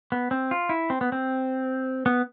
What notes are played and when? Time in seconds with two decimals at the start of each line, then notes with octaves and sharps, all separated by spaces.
0.12 B3
0.31 C4
0.51 F4
0.69 E4
0.90 C4
1.01 B3
1.12 C4
2.06 B3